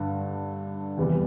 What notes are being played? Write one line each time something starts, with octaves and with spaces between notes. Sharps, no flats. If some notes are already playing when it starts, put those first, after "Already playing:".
Already playing: G2 D3
E2 C3 E3 G3